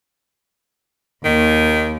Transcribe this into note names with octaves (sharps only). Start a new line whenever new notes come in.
D#2 D#3